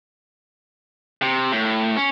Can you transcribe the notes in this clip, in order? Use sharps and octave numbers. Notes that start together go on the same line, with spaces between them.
C3
A2
C#4